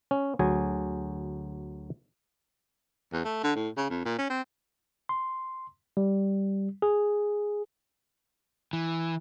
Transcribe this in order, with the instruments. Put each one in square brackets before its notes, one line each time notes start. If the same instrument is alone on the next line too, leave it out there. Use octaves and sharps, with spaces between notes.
[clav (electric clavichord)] C#4
D2 F#3 G#4 G#5
[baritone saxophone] E2
A3
D3
A2
C#3
F2
A#2
C#4
C4
[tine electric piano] C6
G3
G#4
[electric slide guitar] E3